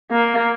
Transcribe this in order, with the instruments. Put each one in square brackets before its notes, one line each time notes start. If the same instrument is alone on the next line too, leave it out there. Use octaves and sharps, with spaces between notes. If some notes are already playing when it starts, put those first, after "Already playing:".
[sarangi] A#3